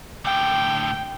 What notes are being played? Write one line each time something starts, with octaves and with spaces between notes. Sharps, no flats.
A2 D3 G5